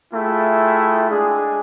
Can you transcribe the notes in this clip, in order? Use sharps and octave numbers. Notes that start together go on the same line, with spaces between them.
A3 E4 F4 G#4 G5
G#3 D4 G#4